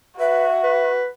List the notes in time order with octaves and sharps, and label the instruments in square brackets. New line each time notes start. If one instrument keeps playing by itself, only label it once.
[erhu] F#4 [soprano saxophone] B4 [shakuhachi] E5
[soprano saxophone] B4